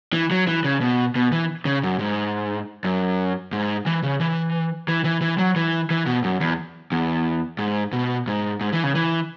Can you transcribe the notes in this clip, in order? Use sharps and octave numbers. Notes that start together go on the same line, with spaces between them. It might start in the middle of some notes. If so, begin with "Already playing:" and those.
E3
F#3
E3
C#3
B2
B2
E3
C#3
F#2
G#2
F#2
G#2
E3
C#3
E3
E3
E3
E3
F#3
E3
E3
B2
F#2
E2
E2
G#2
B2
G#2
G#2
E3
C#3
E3